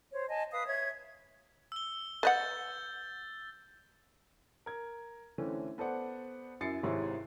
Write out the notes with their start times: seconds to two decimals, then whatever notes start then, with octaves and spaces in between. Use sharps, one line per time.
0.12 C5 C#5
0.29 D#5 G#5 A5
0.51 B4 F5 D#6
0.66 C#5 E5 G#6
1.72 E6 G7
2.23 B4 D#5 F#5 G6 A6
4.66 A#4 G#6
5.38 D3 E3 A3 C4 C#4
5.78 B3 A4 C5 D5 F#5
6.61 F#2 E4 A6 C7 C#7
6.83 G#1 G#2 C3 E4 C#5